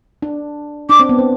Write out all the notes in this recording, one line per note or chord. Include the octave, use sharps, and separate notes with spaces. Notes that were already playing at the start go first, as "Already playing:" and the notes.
D4
D4 D6
C4
B3
C4